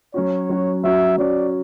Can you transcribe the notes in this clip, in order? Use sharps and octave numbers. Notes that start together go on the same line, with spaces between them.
F#3 C#4 F#4 C#5
F#3 C#4 F#4
F#3 C#4 F#4 E5
F#3 C#4 F#4 D5